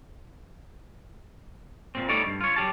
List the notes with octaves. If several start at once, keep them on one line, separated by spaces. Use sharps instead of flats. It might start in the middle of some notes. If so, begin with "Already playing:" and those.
A#2 C4
G3 A3 D#4 C#5 D5
G2
F4 C#5
F#3 G4 A5